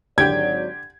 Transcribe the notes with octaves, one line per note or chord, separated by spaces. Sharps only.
G#1 D3 F#3 G4 D5 G5 G#6